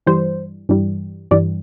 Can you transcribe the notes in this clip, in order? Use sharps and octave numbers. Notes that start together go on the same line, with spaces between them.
G2 E3 G3 C5
G2 E3 G3
G2 E3 G3 D5